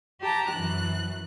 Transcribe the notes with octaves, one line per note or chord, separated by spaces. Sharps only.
G4 A5 A#5
F#2 E3 F#6